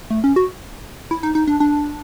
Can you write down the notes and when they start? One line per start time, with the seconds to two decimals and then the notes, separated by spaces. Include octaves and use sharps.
0.10 A3
0.24 C#4
0.36 F#4
1.11 E4
1.23 D#4
1.35 D#4
1.47 D4
1.60 D4